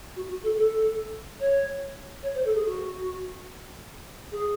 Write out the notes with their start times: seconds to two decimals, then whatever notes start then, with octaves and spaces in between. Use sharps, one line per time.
0.16 F#4
0.29 F#4
0.43 A4
0.57 A4
1.40 C#5
2.23 C#5
2.34 C5
2.45 A4
2.55 G#4
2.66 F#4
4.31 G#4